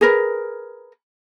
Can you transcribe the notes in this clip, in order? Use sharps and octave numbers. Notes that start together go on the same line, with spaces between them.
G#4 A#4 B4